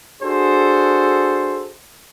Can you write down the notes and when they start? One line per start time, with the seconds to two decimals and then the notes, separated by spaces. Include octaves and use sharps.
0.22 D4 F#4 G#4 A4 C5